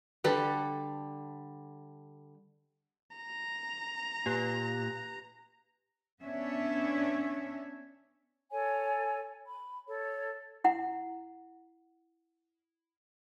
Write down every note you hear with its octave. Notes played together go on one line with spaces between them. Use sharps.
D3 G3 A4 B4
A#5
A#2 G4 B4 F#6
B3 C#4 D4 C#5 E5
A4 C#5 G#5
B5
A4 C#5
E4 F#5